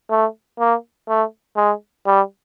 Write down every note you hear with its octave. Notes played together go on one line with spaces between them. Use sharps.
A3
A#3
A3
G#3
G3